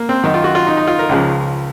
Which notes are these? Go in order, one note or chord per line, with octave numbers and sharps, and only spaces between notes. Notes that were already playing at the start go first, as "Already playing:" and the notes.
Already playing: A#3
C4
F#2 D#3 D#4
F4
F#4
F4
D#4
D#4
F4
A#4
C#2 C#3 F3